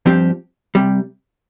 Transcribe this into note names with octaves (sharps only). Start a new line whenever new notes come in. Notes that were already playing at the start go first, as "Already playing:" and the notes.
G2 F3 C4 G4
C2 C3 G3